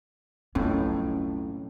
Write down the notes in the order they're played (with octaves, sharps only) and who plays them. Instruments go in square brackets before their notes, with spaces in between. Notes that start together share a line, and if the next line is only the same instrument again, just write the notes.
[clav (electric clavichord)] B1 F2 A2 [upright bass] C#4